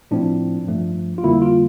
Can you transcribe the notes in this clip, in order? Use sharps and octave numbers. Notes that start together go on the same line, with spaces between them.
A2 F3 C4 D4
G2 F3 A3
F4
F2 D3 G3 A#3 E4
F4